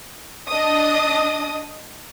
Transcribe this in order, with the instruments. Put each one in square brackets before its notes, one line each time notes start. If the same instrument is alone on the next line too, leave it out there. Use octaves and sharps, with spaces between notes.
[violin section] D4 D#5 D#6